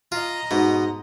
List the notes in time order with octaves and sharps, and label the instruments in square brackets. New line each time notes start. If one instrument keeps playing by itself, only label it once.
[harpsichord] F4 [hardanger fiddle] D#5 A#5
[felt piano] G#2 [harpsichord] B2